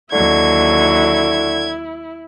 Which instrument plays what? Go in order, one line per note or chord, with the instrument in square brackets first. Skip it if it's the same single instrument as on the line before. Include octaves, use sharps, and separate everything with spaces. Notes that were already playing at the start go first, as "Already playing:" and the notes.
[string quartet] D#2 F#3 C#6 [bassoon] D3 [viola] E4 [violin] G#6